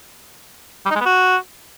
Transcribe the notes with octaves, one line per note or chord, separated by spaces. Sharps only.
G3
D#4
G#3
B3
F#4